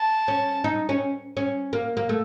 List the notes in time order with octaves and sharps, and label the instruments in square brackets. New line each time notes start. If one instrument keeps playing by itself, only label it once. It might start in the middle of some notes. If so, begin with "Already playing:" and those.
Already playing: [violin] A5
[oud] C#4
D#4
C#4
C#4
A#3
A#3
A3